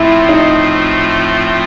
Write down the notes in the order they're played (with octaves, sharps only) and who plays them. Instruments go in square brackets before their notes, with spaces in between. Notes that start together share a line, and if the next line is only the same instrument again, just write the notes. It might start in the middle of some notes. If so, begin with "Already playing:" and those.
Already playing: [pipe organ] A2 F3 A3 C4 F4 [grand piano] E4
[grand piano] D#4